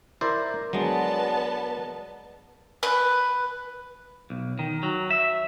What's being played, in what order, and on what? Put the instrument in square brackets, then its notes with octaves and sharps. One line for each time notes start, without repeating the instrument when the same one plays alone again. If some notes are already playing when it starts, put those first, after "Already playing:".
[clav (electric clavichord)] E4 C5 D5 [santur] A#4
[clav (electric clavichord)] F#3 G#3 [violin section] B3 A5 [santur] D4 D#5
[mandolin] B4
[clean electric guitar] B1
D#3
F#3
E5